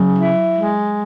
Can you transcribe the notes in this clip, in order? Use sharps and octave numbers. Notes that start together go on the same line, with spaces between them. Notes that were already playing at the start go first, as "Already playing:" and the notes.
Already playing: C#3 F#3
E4
G#3